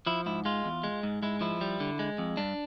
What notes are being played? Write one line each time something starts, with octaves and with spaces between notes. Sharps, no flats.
F3 E4
G#2 E4
G#3 F4
E2
G#3
G#2
G#3 E4
F3 E4
G3
D3
G#3
F2
G2 D4